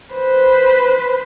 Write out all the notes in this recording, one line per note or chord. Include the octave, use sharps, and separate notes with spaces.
B4 C5